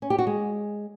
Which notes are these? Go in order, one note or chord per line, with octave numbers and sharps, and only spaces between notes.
C#4
G4
F#4
G#3